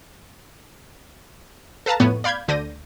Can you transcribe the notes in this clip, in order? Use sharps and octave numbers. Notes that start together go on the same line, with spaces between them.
A4 B4 F5 A5 A#5
F2 A2 B3 C#5 D#7
D5 F5 B5 G6 G#6
D2 D3 D5 G6 A#6 D#7